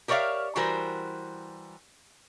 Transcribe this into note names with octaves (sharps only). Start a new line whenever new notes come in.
G4 A#4 C#5 D5 E5 F5
E3 G3 F#4 A#4 C5